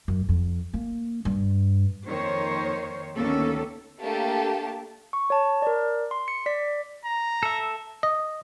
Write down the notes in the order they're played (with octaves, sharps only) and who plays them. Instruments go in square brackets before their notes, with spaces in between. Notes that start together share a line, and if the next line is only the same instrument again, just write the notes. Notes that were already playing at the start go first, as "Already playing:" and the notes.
[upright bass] F#2
F2
A#3
G2
[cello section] F2 D#3 A#3 C5 C#5
D2 D#3 A#3 B3 C#4 A4
[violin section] A3 A#3 D4 G4 A4 A5
[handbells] C#6
C#5 A5
A#4 D5
C6
C#7
D5 B6
[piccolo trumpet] A#5
[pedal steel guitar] A4 E5
[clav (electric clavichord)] D#5